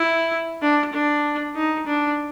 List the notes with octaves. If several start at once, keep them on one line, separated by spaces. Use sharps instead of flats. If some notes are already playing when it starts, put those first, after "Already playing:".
Already playing: E4
D4
D4
D#4
D4